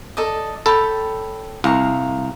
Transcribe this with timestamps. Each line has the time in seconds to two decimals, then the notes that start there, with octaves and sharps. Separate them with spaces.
0.17 A4 D5 D#5
0.66 A4 C#5 G5 B5
1.64 C2 F5 A#5 C#6